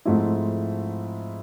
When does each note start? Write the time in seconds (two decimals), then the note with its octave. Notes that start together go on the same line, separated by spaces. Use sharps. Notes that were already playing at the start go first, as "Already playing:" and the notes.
0.05 G#2 F3 A3 C4 E4